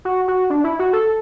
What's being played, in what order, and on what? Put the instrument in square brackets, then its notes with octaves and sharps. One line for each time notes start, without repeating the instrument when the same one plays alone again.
[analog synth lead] F#4
F#4
D4
E4
F#4
A4